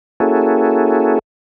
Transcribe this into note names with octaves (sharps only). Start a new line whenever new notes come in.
A#3 C#4 E4 F#4 G#4 A4